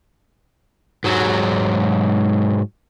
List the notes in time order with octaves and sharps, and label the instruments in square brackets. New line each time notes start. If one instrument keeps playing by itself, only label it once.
[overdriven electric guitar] G#2 F#3